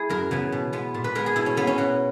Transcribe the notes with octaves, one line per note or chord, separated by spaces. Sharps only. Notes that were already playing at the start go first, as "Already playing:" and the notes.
Already playing: E4 G#4
F#2 A#4
C#3 E3 B3
B2
G#3 B3
A#2
B4
G#3 B3 A#4
G#4
B2 E4
C#4
A#3 B3
C#4
B2 F#4